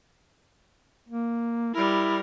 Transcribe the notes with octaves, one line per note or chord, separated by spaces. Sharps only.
A#3
G3 E4 A#4